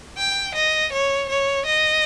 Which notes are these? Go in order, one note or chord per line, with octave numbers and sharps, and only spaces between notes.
G5
D#5
C#5
C#5
D#5